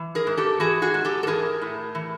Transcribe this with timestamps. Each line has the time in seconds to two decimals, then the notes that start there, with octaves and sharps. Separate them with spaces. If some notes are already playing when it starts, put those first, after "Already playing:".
Already playing: E3
0.15 G#4 A#4
0.27 G#2
0.37 G4 A4
0.60 E3 F#4 G#4
0.82 F#4 G#4
0.94 G#2
1.05 G4 A4
1.23 A4
1.27 E3 G#4 A#4
1.61 A2
1.95 E3